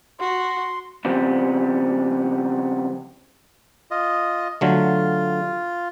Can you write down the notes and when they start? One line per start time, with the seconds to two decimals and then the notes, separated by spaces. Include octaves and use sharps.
0.20 F#4 C6
1.05 C#3 F3 G3 B3 C4
3.91 F4 D#5
4.61 D3 F#3 A3 F4